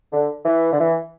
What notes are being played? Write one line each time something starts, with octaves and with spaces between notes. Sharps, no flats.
D3
E3
D3
E3